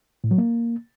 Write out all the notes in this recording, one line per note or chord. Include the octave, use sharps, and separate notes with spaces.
A2
F#3
A#3